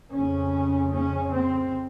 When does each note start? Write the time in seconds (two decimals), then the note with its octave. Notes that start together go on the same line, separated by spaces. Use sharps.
0.12 F2 C#3 C#4
0.92 C#4
1.33 C4